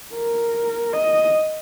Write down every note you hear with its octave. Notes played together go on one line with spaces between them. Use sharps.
A#4
D#5